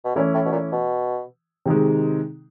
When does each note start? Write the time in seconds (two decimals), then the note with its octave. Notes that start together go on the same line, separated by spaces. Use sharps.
0.05 B2
0.15 A#2 E3 A3 C#4 E4
0.34 A2
0.45 B2
0.52 A#2
0.72 B2
1.66 C3 D#3 G#3